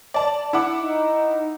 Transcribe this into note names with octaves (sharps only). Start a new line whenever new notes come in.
D5 A5
E4 F#5 D6
D#4